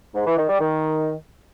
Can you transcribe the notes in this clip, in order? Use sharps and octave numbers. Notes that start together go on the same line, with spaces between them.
G#2
E3
D#3
G3
D#3